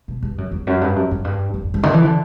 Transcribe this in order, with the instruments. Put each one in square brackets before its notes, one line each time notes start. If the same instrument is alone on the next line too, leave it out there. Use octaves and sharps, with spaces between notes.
[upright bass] B2
G2
F#2
E2
F#2
G2
F#2
F#2
G2
F#2
F#2
G2
D3
E3
D3